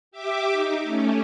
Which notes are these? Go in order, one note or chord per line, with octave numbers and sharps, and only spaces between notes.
G4 E5 D6
D#4
A3 C#4